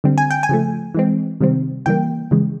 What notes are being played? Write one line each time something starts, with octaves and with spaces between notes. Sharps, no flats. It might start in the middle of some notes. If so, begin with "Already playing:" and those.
D3 G3 C4
G#5
G5
G#5
C#3 F3 A3
E3 G#3 C4
C3 D#3 G3 C4
C#3 E3 G3 A#3 G5
C#3 E3 G#3